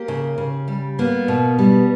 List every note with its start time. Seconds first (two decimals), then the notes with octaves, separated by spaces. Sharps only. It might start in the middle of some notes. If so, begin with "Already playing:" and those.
Already playing: A#3 G4
0.08 C#3
0.38 C#3
0.68 G3
0.99 A#3 B3
1.28 B2
1.59 G3